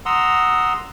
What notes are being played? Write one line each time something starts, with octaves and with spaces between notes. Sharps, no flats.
F#5 A#5 C6 D#6 E6